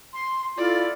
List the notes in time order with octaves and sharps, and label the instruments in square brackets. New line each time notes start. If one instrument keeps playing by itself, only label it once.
[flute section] C6
[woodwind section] E4 A4 [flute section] F4 [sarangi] D5